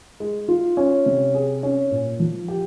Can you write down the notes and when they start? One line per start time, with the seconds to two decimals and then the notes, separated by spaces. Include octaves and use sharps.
0.20 G#3
0.48 F4
0.77 C#4
1.06 C3
1.35 G#4
1.63 C#4
1.91 A#2
2.20 F3
2.48 G4